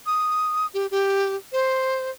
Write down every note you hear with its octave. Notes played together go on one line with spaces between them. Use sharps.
D#6
G4
G4
C5